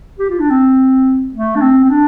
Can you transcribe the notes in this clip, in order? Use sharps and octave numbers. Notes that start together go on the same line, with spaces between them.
G4
F4
D4
C4
A3
D4
C4
C4
D4